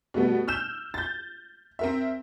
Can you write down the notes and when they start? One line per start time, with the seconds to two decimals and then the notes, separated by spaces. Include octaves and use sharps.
0.14 B2 G3 A3 B3
0.48 E6 F6 G6 E7
0.94 G6 A6
1.79 C4 A#4 E5